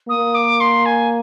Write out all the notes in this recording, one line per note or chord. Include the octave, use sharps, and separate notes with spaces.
A#3 D#6
D6
C6
G#5